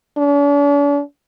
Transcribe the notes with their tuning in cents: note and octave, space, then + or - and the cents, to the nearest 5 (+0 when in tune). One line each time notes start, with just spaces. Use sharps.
D4 -45